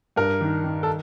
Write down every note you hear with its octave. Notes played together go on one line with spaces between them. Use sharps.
G2 A#4
D#3
D#3
A4